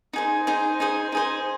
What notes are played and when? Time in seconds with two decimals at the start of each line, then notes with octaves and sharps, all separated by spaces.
0.13 D#4 G#4 C5
0.47 D#4 G#4 C5
0.80 D#4 G#4 C5
1.12 D#4 G#4 C5